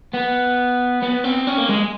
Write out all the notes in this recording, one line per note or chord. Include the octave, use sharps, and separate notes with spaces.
B3
B3
C4
C#4
A#3
G#3